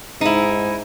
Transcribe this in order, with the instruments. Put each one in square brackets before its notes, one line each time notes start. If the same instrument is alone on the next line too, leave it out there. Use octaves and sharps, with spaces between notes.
[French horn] G#2 [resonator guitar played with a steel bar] D#4 E4